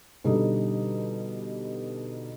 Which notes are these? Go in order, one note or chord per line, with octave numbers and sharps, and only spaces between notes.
B2 D3 G3 D#4 G4 A4